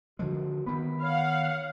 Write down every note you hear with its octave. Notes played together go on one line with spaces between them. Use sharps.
D3 F3 G#3 F#4
D#3 B3 B5
C#5 F5 F#5